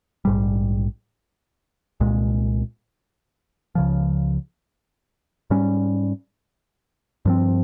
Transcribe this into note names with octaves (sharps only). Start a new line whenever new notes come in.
A#1 G#2 G3
C2 A#2 G#3
C#2 C#3 F3
G#2 G3 C#4
G2 F3 C4